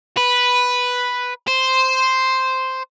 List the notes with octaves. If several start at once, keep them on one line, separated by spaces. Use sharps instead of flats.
B4
C5